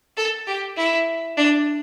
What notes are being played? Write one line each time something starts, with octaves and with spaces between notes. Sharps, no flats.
A4
G4
E4
D4